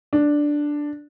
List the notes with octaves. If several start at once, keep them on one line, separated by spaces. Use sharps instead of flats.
D4